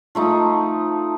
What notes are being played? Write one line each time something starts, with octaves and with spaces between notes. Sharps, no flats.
F3 A3 D#4